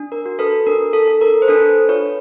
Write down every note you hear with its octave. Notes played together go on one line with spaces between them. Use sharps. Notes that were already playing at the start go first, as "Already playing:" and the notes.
Already playing: D4
A#4
F#4
A4 B4
D4 A#4
A4
A4
A#4
C5
D4 A4 B4
F4 B4 C#5